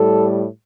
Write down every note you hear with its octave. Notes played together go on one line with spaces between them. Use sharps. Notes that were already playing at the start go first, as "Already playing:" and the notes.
Already playing: A2 G3 A4